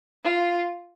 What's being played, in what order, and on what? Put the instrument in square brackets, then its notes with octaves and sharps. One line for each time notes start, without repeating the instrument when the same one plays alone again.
[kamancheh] F4